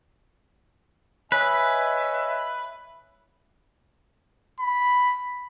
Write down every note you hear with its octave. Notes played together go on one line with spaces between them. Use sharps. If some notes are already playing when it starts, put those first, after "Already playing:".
B4 C#5 D#5 E5 G#5
B5